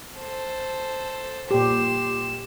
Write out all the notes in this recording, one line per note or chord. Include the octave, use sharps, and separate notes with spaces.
A4 C5
A#2 G4 C6 E7